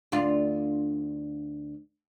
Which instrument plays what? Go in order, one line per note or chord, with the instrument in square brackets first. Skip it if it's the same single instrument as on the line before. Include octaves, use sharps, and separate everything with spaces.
[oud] D2 D4 F4